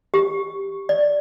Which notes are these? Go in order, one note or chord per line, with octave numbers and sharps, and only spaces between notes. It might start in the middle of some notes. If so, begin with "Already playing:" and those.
G4
D5